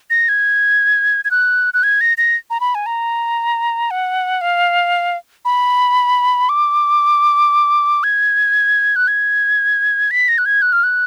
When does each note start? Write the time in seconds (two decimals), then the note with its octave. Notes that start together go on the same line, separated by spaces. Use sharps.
0.10 A#6
0.29 G#6
1.25 G#6
1.31 F#6
1.74 F#6
1.83 G#6
2.01 A#6
2.18 A#6
2.50 A#5
2.60 B5
2.75 G#5
2.86 A#5
3.91 F#5
4.41 F5
5.45 B5
6.49 D6
8.04 G#6
8.96 F#6
9.08 G#6
10.11 B6
10.28 A#6
10.38 F#6
10.46 G#6
10.62 F#6
10.72 F6
10.83 F#6